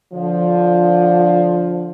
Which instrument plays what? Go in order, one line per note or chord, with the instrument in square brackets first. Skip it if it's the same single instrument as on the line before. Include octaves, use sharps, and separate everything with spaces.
[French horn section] D3 F3